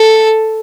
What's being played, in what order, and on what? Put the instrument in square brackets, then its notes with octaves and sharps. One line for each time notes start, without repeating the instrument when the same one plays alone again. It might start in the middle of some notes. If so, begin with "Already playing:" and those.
Already playing: [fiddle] A4